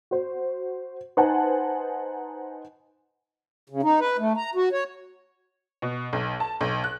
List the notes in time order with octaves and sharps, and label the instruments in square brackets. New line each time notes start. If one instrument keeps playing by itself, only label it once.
[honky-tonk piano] F#4 C5
D#4 B4 C5 F#5 G#5 A5
[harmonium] C#3
D#4
B4
A3
A#5
F#4
C#5
[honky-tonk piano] B2
B1
A5
B1
F#6